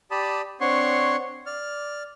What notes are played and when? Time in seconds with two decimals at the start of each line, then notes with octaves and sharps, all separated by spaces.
0.11 G4 D5 A5 B5 D#6
0.61 C4 D4 C#5 F#5 C6 C#6
1.46 D5 F6